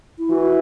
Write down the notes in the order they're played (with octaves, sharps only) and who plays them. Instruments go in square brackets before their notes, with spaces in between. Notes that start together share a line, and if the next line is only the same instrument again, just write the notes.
[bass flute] E4
[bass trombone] E3 [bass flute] F#4